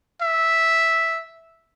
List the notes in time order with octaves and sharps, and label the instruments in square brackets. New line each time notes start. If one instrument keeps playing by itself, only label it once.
[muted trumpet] E5